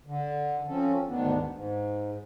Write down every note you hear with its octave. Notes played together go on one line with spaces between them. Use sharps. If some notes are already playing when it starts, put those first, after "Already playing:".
D3
F3 C4 C#4 A4
D2 G#2 D#3 B3 D4
G#2